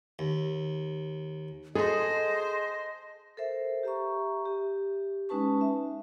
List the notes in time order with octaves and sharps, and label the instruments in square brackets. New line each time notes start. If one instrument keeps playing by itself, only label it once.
[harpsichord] D#2
[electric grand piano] G#4 [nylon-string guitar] A4 [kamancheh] C5 [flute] D#5
[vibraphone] A4 A#4 C5 E5
G4 E5 A#5 C#6
G4
G#3 C#4 D#4 B4 A5 C#6
E5